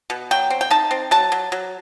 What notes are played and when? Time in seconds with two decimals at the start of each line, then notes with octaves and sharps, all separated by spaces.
0.10 B2
0.31 F#3 G5
0.50 C4
0.61 G5
0.70 D#4 A5
0.91 C4
1.11 F#3 A5
1.32 F#3
1.52 F#3